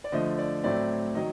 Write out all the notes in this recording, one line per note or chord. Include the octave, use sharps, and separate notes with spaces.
D5
D3 F3 A3 D#5
D5
A2 F#3 A3 C4 D5
D#3 F#3 D#5